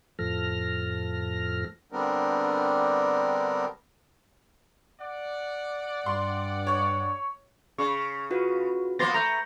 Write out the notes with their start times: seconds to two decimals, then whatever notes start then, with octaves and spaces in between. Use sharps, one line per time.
0.19 F2 A2 F3 A4 F6 A#6
1.92 D3 G3 B3 C4 D4 A#4
5.00 D5 F#5
6.06 G2 C6
6.67 C#5
7.78 C#3 C#6
8.31 F4 F#4 B4
8.99 F3 A#3 B3 C6 A6 A#6
9.14 A3 A#5 G6 A#6